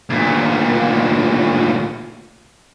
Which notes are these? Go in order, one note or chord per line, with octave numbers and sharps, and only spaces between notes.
D2 A#2